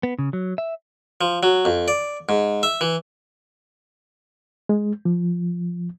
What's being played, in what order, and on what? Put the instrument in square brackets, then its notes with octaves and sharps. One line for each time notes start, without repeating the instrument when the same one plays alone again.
[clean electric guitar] B3
C#3
F#3
E5
[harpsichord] F3
F#3
F2
D5
G#2
E5
E3
[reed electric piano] G#3
F3